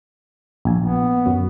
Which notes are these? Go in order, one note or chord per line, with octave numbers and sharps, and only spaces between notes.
A#1 G#5
B3
F#2